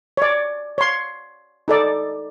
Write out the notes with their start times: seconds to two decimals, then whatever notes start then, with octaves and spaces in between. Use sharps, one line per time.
0.17 C#5 D5
0.78 C#5 C6
1.68 D#4 A4 D5